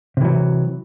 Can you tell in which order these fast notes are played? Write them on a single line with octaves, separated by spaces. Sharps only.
C3 E3 F#3